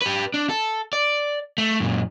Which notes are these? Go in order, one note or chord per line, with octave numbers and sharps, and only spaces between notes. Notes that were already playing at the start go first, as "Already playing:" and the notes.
G4 B4
D4
A4
D5
A3
F#2 A#2